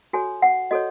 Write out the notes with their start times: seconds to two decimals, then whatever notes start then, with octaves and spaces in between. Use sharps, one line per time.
0.13 F#4 A4 C#5 G#5
0.42 F#5
0.71 F#4 A4 C#5 D#5